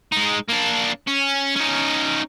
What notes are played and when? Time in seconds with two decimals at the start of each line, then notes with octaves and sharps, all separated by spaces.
0.12 G#3 D#4
0.48 A#3 D4
1.07 C#4
1.56 C#4 D#4